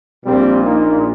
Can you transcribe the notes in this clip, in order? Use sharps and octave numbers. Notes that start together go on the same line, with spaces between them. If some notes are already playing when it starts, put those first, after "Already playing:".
A#1 A#2 G3 C4
A#3 D#4